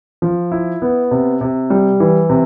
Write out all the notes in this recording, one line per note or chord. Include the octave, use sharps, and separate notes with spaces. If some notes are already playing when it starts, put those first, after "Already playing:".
F3
E4
B3
C3
C3
G3
E3
C3